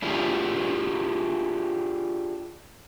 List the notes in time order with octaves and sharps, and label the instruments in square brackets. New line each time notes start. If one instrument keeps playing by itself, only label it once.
[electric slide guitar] D4 E4 F4 G4 G#4